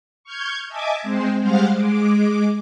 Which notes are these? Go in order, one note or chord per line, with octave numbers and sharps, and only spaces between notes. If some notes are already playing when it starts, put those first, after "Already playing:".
C#6 F6 G6 G#6
D#5 E5 G#5 A5 D6 G#6
G#3 C4 C5
G3 G#3 C5 F5 F#5 F6
G#3 D6